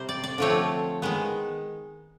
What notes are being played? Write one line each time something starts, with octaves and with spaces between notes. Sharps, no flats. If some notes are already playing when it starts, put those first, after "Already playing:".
Already playing: C3 G3 C5
D5
D5
D3 F3 A3 C4 C#5
D#3 G#3 B3